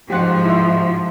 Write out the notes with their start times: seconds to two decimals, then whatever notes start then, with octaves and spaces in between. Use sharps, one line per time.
0.10 C#2 G#2 F3 F#4 G4 C5 F#5
0.45 E4 E5